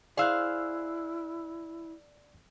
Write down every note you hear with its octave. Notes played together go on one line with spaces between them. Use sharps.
E4 G#4 C5 D5 F5 E6 F#6